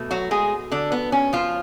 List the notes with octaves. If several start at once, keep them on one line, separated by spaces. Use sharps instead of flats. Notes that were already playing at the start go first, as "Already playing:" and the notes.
Already playing: B2 A3
F#3 F#4
G#3 G#4
D3 D4
B3
C#4
F3 F4